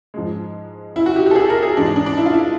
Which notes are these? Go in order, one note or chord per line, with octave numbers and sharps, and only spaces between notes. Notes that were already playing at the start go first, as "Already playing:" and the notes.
G#2 F3 G#3
E4
F#4
G4
G4
A4
G#4
A#4
G#4
G#2 E3 G#3 D4
D#4
D4
D4
E4
F4
E4